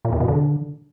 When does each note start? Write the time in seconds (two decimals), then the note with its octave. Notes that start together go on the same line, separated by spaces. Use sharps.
0.05 A#2
0.12 E2
0.20 B2
0.28 D3